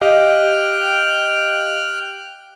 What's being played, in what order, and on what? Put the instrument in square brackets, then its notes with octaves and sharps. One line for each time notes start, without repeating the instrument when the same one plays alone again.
[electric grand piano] G4 D#5 F5 [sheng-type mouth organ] G5 F6 F#6